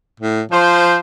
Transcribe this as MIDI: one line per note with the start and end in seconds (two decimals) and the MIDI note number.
0.20 0.42 45
0.52 1.00 53
0.52 0.96 72